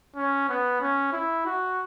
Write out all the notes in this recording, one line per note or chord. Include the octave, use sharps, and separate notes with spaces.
C#4
B3
C#4
E4
F#4